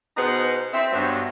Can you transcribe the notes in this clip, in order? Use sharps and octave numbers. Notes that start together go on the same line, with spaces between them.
B2 B3 D#4 G#4 B4 C5
C4 E5
G2 F#3 B3